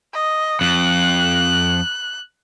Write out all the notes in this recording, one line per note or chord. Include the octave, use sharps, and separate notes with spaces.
D#5
F2 F#6